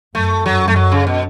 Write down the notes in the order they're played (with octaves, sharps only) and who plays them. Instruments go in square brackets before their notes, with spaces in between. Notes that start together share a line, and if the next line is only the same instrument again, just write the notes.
[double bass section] F#2 [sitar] A3
[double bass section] F#2 [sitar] F#3
[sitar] A3
F#3
C#3
B2